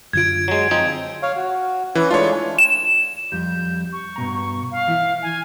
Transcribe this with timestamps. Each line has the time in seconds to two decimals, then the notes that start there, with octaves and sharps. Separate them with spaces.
0.13 F#2 D3 F4 G#6 D7
0.48 F#3 G#3
0.71 F3 C4 D#4
1.23 C#5 F5
1.36 F#4
1.95 E3 C#4 B4
2.11 G#3 A3 D4 F4 C#5
2.58 E7
3.32 F2 G3 G6
3.92 C#6
4.16 G2 B2 A#5
4.71 F5
4.88 E3 E4
5.22 G#5